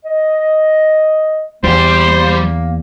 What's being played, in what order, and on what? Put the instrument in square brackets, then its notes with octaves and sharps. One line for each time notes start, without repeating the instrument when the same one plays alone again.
[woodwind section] D#5
[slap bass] E2 [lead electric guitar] G3 [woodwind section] A#3 [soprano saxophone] C5
[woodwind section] A#3